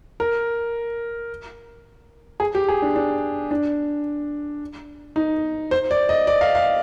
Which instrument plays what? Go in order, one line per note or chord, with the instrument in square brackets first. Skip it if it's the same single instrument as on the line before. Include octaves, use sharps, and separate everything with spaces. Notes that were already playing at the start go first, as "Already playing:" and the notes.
[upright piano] A#4
G#4
G4
G#4
D4
D4
D4
D#4
C5
D5
D#5
D5
F5
F5